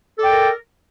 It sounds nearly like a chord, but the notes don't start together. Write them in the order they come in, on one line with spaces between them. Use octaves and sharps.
A4 D5 G5 A#4